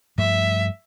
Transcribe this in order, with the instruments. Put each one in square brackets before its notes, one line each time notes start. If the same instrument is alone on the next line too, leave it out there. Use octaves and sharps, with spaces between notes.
[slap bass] G2 F3 A3 [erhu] E5